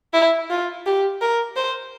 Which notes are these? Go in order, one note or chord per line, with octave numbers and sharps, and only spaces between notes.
E4
F4
G4
A#4
C5